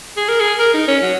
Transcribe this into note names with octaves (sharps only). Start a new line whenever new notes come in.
G#4
A#4
G#4
A#4
D#4
C#4
F#3